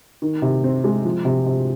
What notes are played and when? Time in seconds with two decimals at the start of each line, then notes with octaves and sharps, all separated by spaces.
0.22 D#3
0.42 C3
0.64 C4
0.84 G#3
1.05 F3
1.25 C3
1.46 C3